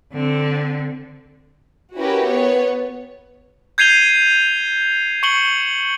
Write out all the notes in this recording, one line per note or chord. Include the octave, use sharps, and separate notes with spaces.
D3 C4
C#4 E4 F#4 G4 A#4 B4
B3 C#5
G6 G#6 C7 D#7 F7 G7
C#6 C#7 F#7 G7